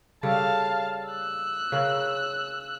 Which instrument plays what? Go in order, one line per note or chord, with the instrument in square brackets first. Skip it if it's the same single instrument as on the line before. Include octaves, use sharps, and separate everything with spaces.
[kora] C#3 G3 A4 [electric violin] F5 A5
[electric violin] E6 F#6
[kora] C#3 C#4 A#4